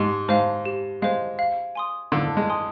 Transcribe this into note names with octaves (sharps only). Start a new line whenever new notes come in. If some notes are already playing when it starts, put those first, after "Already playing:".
Already playing: G#2 G4
G#2 C5 F5
G4
G#3 C5 F5
F5
G#5 C6 D#6
D3 F5
G#3
G#5 C6 D#6